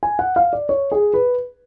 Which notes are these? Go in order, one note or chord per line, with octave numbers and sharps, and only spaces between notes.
G#5
F#5
F5
D5
C#5
G#4
B4